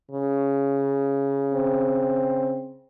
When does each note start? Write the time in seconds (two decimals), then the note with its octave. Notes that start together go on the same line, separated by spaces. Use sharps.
0.11 C#3
1.54 C4